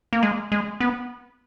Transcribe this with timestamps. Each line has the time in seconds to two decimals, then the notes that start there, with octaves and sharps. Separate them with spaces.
0.13 A#3
0.23 G#3
0.52 G#3
0.80 B3